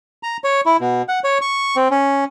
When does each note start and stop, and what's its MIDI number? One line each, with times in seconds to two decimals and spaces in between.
0.23 0.37 82
0.44 0.61 73
0.66 0.77 64
0.80 1.02 47
1.09 1.19 78
1.24 1.38 73
1.41 1.76 85
1.76 1.88 60
1.91 2.24 61